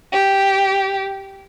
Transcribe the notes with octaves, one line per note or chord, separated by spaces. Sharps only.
G4